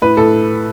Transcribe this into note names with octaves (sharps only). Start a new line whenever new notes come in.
A2 B4
A2 A4